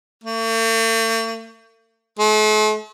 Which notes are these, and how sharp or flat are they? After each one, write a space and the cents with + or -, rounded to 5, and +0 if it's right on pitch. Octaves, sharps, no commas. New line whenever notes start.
A3 +45
A3 -45